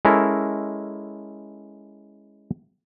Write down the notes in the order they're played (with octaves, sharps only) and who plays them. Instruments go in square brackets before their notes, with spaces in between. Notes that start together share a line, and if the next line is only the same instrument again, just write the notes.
[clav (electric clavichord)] G#3 C#4 E4 A4 A#4